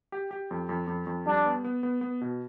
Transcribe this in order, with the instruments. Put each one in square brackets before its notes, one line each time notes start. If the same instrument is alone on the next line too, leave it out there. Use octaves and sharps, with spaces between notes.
[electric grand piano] G4
G4
F2
F2
F2
F2
[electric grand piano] G3 [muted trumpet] D4
[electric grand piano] B3
B3
B3
B3
B2